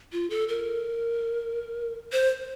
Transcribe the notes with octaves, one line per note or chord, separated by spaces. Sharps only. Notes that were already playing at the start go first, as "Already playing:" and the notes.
F4
A4
A#4
C5